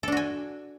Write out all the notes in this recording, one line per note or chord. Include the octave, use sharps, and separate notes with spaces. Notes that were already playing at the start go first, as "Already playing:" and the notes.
D4 F#4 A4 G#5